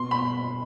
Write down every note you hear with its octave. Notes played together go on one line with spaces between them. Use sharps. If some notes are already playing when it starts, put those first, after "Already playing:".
Already playing: B2 C6
B5